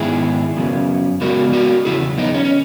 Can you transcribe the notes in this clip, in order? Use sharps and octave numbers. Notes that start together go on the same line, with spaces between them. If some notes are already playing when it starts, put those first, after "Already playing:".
Already playing: G#2 D#3 G#3 B3 E4 G#4
F#2 C#3 F#3 B3
C#3 G#3 B3 F#4 A#4
F#4 A#4
E2 C#3 F#3 E4 G#4
B3 D#4
C#4
C#4